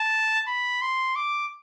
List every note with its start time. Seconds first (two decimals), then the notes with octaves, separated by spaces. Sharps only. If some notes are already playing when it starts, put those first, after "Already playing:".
Already playing: A5
0.47 B5
0.82 C6
1.16 D6